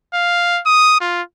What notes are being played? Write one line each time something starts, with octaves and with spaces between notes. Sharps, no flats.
F5
D#6
F4